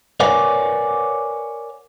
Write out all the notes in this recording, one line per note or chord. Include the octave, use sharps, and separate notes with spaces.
A#4 B4 C#5 D5 F#5 G#5